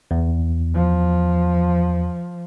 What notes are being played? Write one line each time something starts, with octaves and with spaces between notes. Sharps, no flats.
E2
F3